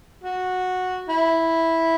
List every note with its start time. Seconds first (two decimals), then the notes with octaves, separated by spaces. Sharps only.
0.24 F#4
1.09 E4